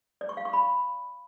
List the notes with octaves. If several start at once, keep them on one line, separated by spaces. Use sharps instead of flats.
D5
C#6
F5
C#6
B5